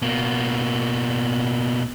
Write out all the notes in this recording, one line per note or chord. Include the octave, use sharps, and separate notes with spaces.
B2 A#3